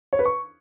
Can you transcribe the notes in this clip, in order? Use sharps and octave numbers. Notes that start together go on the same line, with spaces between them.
C#5
B4
C#6